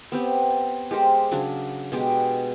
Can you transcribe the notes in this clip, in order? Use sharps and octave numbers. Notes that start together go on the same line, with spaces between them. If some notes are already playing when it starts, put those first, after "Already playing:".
B3 C4 G4
G#3 G4 A#4 C5
C#3 F#3 D4
B2 G#3 G4